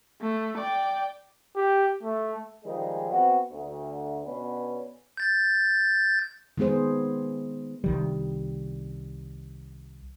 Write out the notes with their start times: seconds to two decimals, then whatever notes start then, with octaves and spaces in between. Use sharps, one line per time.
0.21 A3
0.58 D5 G5
1.56 G4
2.03 A3
2.65 D#3 F3 G3 G#3
3.11 B3 C4 F#4
3.51 D2
4.26 B2 B3 C#4 D4 B4
5.17 G6 A6
6.57 D#3 G#3 B3 G#4 C5
7.84 C2 D#3 G3